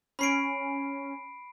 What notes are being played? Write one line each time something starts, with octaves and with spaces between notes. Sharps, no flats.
C#4 B5 C7 D7